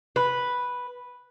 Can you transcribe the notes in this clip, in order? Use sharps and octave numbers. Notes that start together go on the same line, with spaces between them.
B4